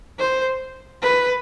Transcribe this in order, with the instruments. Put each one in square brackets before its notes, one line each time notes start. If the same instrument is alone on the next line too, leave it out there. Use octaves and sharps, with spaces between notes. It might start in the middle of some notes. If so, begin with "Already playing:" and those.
[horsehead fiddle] C5
B4